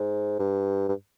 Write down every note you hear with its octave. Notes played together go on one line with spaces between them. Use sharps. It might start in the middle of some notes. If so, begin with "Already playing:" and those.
Already playing: G#2
G2
G2